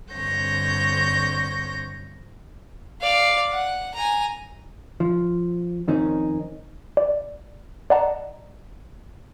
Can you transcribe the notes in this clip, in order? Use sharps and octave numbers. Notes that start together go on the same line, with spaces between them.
G2 D3 C4 C#5 G6 A#6
D5 F5
F#5
G#5 A#5
F3
F2 D#3 C4 C#4 D#4
D5
D5 D#5 F#5 A5 A#5